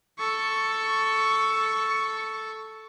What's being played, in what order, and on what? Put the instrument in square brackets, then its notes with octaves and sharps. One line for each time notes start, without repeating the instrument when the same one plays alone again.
[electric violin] A4 C#6